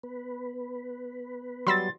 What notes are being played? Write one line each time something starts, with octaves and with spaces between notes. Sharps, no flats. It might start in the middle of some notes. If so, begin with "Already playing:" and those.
B3 B4
F#3 G3 B3 B5 C6 E6 A6 A#6